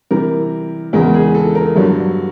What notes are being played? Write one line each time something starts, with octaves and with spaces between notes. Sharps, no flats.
C3 E3 G3 A#4
E2 C#3 E3 G#3 A#4
G#4
A4
A#4
G2 D3 F#3